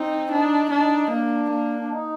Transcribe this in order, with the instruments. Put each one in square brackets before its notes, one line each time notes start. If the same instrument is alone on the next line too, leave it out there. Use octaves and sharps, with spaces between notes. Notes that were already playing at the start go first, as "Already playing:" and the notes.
Already playing: [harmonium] C4 [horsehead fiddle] D#4
[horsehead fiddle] D4 [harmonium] D#4
[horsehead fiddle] D4 [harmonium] D#4
[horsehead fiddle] A#3 [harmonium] D4
[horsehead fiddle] A#3
[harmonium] D4
D#4